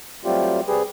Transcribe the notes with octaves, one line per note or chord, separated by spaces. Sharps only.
F#3 G3 A3 C4 F4 G4
C3 G3 G4 G#4 B4